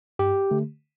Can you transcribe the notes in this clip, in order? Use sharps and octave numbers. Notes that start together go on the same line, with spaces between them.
G2 G4
D3 A3